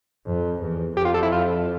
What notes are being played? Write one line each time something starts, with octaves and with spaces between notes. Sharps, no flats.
F2
E2
F2 G4
F4
A4
E4
F4